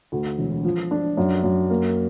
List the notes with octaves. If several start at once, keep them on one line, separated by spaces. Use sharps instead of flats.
D2
E1
F3
D4
F#2
F#2
A#3